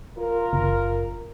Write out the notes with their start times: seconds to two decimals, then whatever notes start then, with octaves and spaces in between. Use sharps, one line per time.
0.18 F4 A#4
0.53 F#1